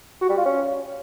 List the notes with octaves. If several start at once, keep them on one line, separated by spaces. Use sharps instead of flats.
F#4
G3
F4
C#4